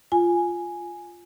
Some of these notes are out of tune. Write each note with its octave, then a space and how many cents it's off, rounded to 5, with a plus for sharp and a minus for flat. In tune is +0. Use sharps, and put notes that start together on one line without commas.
F4 +0 G#5 +0